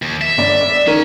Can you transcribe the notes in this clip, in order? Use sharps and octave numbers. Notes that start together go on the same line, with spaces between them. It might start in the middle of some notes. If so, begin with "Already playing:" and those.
D#2
E5
G1 D5
D5
D#3 C#4 D#4 A#4